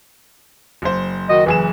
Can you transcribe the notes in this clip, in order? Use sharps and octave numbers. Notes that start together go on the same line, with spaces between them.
F#1 C5
D#3 F#4 D#5
F#1 E3 G#4 E7